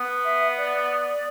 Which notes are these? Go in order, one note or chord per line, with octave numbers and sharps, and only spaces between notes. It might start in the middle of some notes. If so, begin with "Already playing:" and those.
Already playing: B3
E5
D5